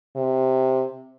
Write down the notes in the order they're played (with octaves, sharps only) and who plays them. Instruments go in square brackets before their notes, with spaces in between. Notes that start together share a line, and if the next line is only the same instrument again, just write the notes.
[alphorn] C3